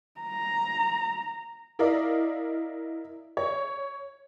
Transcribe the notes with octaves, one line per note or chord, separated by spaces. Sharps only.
A#5
E4 A#4 D5 D#5 F5
C#5